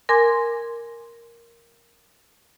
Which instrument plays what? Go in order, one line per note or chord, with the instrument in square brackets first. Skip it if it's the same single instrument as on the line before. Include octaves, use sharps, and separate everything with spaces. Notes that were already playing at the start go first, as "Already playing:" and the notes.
[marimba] A#4 G#5 C6 D6 G#6